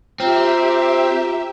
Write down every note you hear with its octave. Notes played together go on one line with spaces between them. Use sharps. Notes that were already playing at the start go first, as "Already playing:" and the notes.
C4 F4 G4 E5 G5 A#5